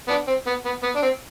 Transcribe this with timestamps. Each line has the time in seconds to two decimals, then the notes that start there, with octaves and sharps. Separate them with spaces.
0.09 B3 D4
0.28 C4
0.47 B3
0.66 B3
0.83 B3
0.96 D4
1.02 C4